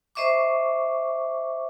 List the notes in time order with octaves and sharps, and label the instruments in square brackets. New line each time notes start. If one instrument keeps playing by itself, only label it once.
[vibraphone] C5 D#5 E5 C#6 D6